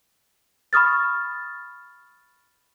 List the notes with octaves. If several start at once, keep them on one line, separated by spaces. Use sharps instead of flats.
B5 C#6 D#6 F6 A6